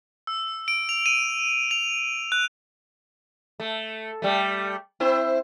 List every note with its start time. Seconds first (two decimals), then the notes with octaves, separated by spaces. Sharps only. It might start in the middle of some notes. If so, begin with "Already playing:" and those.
0.27 E6
0.68 D7
0.89 F7
1.06 D#7
1.71 F7
2.32 F#6
3.60 A3
4.22 G3 A3
5.00 C4 E4 C5